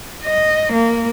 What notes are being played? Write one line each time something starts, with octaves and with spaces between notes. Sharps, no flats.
D#5
A#3